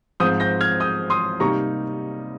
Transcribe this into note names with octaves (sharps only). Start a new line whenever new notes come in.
G#2 F3 C4 D#6 G6
G6 A#6
F6 G#6
D#6 G6
C6 D#6
C3 G3 A#3 D#4 A#5 C#6